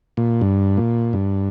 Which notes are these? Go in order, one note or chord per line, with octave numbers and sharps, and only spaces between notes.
A#2
G2
A#2
G2